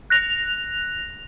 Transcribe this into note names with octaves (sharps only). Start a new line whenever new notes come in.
F#6 A#6 F7